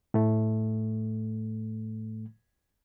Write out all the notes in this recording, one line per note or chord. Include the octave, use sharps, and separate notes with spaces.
A2 A3